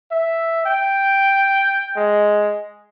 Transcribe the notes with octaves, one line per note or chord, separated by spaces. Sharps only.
E5
G5
G#3